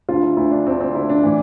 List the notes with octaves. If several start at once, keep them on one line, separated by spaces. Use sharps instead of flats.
D2 D3 F4
E4
D2 D3 E4
D4
D2 D3 C4
C4
D2 D3 E4
D4
A2 E3